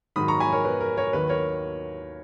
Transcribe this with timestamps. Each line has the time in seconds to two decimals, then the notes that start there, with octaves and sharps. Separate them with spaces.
0.16 G#2 D#3 F#3 B5 D#6
0.28 A#5 C#6
0.40 G#5 B5
0.52 A#4 C#5
0.65 B4
0.81 A#4
0.97 A#4 C#5
1.13 D#2 D#3 F#3 B4
1.29 A#4 C#5